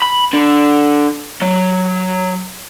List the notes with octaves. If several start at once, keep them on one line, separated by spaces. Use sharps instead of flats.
B5
D3
F#3